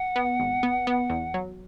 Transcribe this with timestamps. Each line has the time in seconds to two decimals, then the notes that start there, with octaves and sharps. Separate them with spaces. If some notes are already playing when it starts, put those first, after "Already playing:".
Already playing: F#5
0.16 B3
0.40 G#1
0.63 B3
0.87 B3
1.10 E2
1.34 F#3